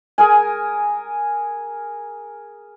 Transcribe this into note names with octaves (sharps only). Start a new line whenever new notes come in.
G#4 A#4 G#5